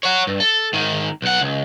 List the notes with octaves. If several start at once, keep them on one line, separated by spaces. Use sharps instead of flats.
C#5 F#5
G2
A4
G#2 D#3
B1 F#5
C#2